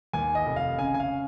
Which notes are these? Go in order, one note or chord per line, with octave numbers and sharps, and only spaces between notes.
D#2 G#5
D#5
F1
F5
C#3 G#5
G#5
F5